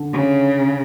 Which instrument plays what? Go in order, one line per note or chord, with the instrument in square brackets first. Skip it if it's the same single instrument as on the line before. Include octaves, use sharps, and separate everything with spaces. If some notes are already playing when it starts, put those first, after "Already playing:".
Already playing: [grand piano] D3
[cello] C#3